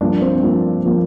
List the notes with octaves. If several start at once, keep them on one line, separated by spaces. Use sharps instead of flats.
G2 F3 A#3 D4
C4
G2 F3 A#3
F3 A#3